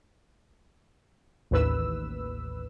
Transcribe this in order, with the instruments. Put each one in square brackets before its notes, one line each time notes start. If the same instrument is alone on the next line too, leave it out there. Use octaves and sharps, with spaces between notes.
[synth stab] A1 D#2 B4 E6